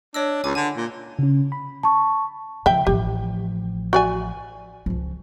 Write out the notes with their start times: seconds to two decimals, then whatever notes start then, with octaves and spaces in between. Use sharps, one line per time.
0.14 D4 C#5 D#5 E6
0.44 C#2 G#5 D6
0.55 D3 G#5
0.77 A#2
1.19 C#3 C#4
1.52 B5
1.83 A5 C#6
2.66 C#3 F3 E5 G5
2.87 A1 F3 G4
3.93 F#4 D5 G#5
4.86 C#2 F3